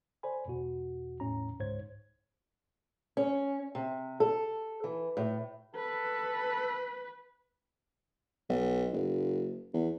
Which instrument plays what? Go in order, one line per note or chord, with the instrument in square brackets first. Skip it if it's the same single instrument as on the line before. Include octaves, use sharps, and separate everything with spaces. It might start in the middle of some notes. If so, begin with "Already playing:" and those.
[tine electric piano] A4 C5 D5 G#5 B5
E2 B2 F#4
E2 A2 C#4 A#5
C#2 G#2 C5 C#5 G#6
[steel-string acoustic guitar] C#4
C3
A4
E3
A2
[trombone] A4 [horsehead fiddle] B4
[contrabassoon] B1
F#1
E2